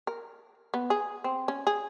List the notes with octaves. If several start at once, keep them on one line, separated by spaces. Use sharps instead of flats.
A#4
B3
G#4
C4
C#4
G#4